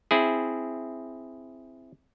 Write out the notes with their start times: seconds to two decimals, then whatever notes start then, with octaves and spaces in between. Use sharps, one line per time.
0.11 C4 E4 G#4